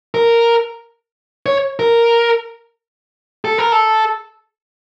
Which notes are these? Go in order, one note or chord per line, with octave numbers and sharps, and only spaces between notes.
A#4
C#5
A#4
A4
A#4
A4